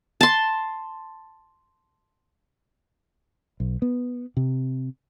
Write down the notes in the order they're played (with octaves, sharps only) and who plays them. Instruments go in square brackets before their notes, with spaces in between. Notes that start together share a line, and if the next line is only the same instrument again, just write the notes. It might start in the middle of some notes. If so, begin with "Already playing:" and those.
[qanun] A5 C6
[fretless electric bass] B1
B3
C3